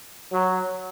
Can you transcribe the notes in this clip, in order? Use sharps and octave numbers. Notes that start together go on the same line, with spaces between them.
F#3